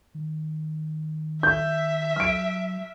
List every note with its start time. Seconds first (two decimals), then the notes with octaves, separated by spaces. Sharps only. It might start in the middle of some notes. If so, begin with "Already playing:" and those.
0.15 D#3
1.43 E5 G6
2.16 F#3 F6 D7